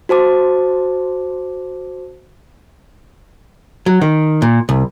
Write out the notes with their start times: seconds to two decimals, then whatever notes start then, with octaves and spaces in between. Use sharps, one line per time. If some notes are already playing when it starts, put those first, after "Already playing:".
0.09 F#4 C5 A5 D6
3.86 F#3
4.01 D#3
4.42 A#2
4.69 C2